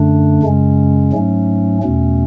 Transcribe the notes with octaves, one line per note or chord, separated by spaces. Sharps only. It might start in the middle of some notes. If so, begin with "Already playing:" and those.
Already playing: F#2 D3 A3 D4
F#2 C#3 G#3 C#4
G#2 F#3 A3 C#4
E2 B2 A3 C#4